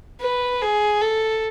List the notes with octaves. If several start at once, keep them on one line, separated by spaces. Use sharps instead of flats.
B4
G#4
A4